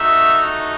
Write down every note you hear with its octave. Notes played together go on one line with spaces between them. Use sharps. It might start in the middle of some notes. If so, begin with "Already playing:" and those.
Already playing: A3 D#4 F#4 E5